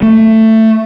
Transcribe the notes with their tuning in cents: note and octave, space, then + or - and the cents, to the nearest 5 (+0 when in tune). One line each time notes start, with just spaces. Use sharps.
A3 +15